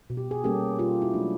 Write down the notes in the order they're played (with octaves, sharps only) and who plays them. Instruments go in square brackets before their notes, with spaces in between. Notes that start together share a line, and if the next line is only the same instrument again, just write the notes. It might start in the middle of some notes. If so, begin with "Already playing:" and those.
[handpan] B2
G4
G#4
G3 A#3 C#4 G4 A4
B2 F4 G4
E4 F#4
F#3 A3 D4